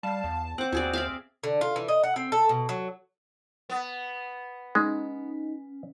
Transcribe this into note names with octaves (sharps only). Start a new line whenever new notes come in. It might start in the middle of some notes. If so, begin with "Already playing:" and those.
G3 F5 A5
E2
C4 C5 F#5 D6
D#2 F#4 G#4 D5
D5 E5 F5
D3
F4
E3
D#5
F#5
C4
A4
B2
F#3
B3
G#3 C#4 D#4